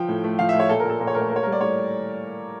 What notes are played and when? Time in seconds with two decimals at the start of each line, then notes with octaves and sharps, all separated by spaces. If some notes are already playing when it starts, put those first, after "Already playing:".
Already playing: F3 G5
0.09 A2
0.24 A3
0.39 F3 F5
0.49 E5
0.54 A2
0.59 C#5
0.69 A#2 A4
0.80 A#4
0.85 A#2 A4
1.00 A#2 A#4
1.07 C#5
1.15 A3 A#4
1.21 C#5
1.29 A#3 A#4
1.36 C#5
1.43 G3 A#4
1.52 D5
1.61 A2 C#5